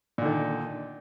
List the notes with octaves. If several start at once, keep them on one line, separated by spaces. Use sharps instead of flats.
A#2 D3 D#3